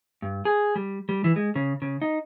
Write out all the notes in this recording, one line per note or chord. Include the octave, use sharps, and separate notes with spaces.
G2
G#4
G3
G3
E3
G#3
C#3
C#3
D#4